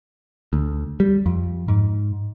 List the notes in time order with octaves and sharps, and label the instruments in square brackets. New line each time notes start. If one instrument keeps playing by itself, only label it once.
[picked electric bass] D2
G3
F2
G#2